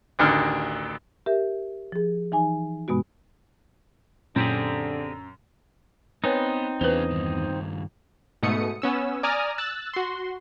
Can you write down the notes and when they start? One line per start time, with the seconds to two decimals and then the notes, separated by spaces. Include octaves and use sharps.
0.19 A1 D2 D3 D#3 F6
1.26 G4 A#4 E5
1.92 F3 G#4
2.32 E3 D#4 G#5
2.88 G2 B2 G#3 B3 F#4
4.36 F#2 A#2 D3 C4 G4 G#4
6.24 B3 C4 D#4 B4 C#5 G#5
6.81 E2 C#4 F4 G#4 B4 C5
7.11 G2 D#3
8.43 G#2 B2 A3 D#6 C#7
8.82 B3 C#4 E6
9.23 D5 G#5 A#5 D#6 F6
9.58 E6 F#6 A6
9.94 F#4 C6